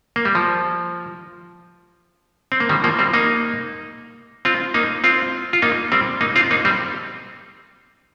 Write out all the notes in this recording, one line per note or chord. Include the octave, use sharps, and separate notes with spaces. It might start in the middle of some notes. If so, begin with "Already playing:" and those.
A#3
G3
F3
C4
A#3
D#3 G3
F3 A#3
G3 C4
A#3 D#4
C4 F4
A#3 D#4
C4 F4
F4
A#3 D#4
G3 C4
A#3 D#4
C4 F4
A#3 D#4
G3 C4